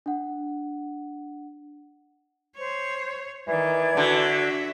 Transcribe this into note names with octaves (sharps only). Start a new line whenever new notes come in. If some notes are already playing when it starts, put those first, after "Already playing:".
D4 F#5
C5 C#5
D#3 E3 D5 G#6
D3 F#4 E5